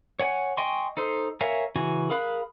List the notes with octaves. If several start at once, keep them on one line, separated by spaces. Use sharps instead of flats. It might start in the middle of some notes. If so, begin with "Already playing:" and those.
C#5 F#5 G#5
D#5 G5 G#5 C6 C#6
D#4 A4 C5
A#4 C#5 E5 F5 G#5
C#3 E3 F#4 G#5
G#4 A#4 F5 B5 F#6